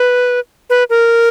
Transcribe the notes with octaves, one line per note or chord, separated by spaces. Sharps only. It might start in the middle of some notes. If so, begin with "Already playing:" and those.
Already playing: B4
B4
A#4